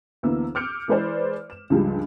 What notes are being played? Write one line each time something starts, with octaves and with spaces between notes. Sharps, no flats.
D2 E3 A#3 B3 E6
D6 E6 F6 G6 C#7 D7
E3 G#3 B4 C5 D5
E7
C#2 G2 F3 G3 G#3